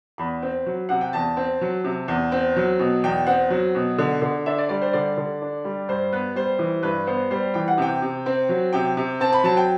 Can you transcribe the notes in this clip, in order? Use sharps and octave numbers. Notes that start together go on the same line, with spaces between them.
E2 B5
C4
F#3
C3 F#5
G5
E2 A5
C4
F#3
C3
E2
C4
F#3
B2
E2 G5
C4 F#5
F#3
B2
D3
D3
D4 E5
D5
G3 D5
C5
D3 D5
D3
D4
G3
G2 C5
B3 B4
G3 C5
E3
G2 B4
B3 C5
G3 C5
E3 G5
F#5
C3 G5
C3
C4
F#3
C3 G5
C3
C4 A5
B5
F#3 A5
G5